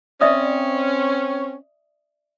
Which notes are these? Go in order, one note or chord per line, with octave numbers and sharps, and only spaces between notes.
C4 C#4 D5 E5 D#6